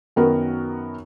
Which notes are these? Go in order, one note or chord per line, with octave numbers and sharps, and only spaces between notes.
F#2 D#3 B3 F#4 A#4